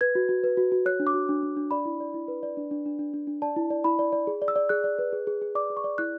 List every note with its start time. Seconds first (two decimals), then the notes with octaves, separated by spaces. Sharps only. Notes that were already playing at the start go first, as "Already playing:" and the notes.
0.01 B4 G#6
0.15 F#4
0.29 F#4
0.44 B4
0.57 F#4
0.72 F#4
0.86 C#5 F#6
1.00 D4
1.07 D6
1.14 F#4
1.29 D4
1.43 D4
1.56 D4
1.71 D5 B5
1.85 E4
2.00 D5
2.14 E4
2.28 B4
2.43 D5
2.57 D4
2.71 D4
2.86 D4
2.99 D4
3.14 D4
3.27 D4
3.42 D5 A5
3.56 E4
3.70 D5
3.84 E4 B5
3.99 D5
4.13 D5
4.27 G#4
4.42 D5
4.48 E6
4.56 D5
4.69 G#4 F#6
4.84 D5
4.99 B4
5.13 G#4
5.27 G#4
5.42 G#4
5.55 D5 D6
5.70 G#4
5.77 C#6
5.84 D5
5.98 E4 F#6